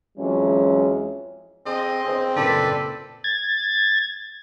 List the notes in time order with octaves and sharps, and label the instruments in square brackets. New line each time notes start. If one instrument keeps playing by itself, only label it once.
[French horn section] F2 E3 F#3 G#3 C#4
[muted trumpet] C4 [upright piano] G#4 [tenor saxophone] D#5
[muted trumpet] C4 [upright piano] G#4 C5
[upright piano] F#1 A#2 [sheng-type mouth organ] A4 D5 [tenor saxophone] B4
[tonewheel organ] G#6 A6